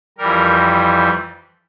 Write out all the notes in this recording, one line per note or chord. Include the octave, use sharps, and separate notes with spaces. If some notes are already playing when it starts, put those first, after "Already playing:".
F2 E3 G3 A#4